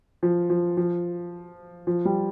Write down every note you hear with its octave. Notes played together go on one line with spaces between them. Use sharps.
F3
F3
F3
F3
G3